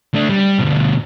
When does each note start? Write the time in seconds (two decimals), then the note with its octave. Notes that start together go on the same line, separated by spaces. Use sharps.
0.14 A3 D4
0.29 G3
0.59 D2 B2